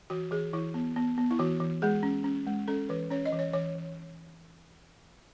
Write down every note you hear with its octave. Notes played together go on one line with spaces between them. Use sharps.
E3 F#4
E3 G#4
E3 E4
B3
B3
B3
E4
E3 F#4
E3
G#3 G#4
C#4
C#4
G#3
C#4 A4
E3 B4
C#4 C#5
D#5
E3
C#5
E3 C#5
E3